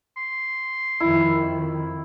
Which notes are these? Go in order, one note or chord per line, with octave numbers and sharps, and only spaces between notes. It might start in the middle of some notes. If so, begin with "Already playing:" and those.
C6
F2 D#3 E4